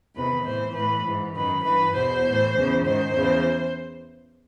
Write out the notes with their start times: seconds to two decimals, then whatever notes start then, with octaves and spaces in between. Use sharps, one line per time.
0.15 E2 C3 D#3 B4
0.45 A2 E3 C5
0.74 A2 E3 B4
1.05 G#2 E3
1.35 F#2 D#3 B4
1.64 G2 E3 B4
1.95 E2 B2 C5
2.25 A2 E3
2.55 E2 C#3 E3
2.84 G#2 D#3 C5
3.15 E2 C#3 E3